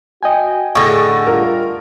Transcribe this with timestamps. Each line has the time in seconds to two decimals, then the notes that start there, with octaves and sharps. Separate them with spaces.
0.23 F#4 D#5 G5 G#5
0.75 A2 D3 G#4 C#6 A6 A#6
1.27 G3 F4 A#4